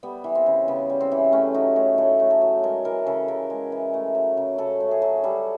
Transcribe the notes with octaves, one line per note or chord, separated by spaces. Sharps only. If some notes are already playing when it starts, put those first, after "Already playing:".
G3 B3
E3
C4
C#3
C#3 B3
G3
C4
E3
A3 C#4
F#3 D#4
A2
A2 A4
A3
A4
F#3
G#3 A#4
E3 A#4
C#3 A4
C#3 A#4
G#3
E3
A3
F#3
C#3
C#3 A4
A3
G#4
F#3
G3 A4